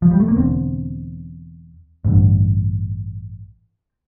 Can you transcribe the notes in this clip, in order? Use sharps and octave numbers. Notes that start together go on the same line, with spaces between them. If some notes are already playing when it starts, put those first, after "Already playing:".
F3
G3
A3
A#3
E1 E2 D3 C4
A1 G2 D3